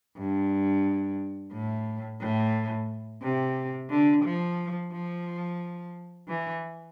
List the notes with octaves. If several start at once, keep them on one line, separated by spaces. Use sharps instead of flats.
G2
A2
A2
C3
D3
F3
F3
E3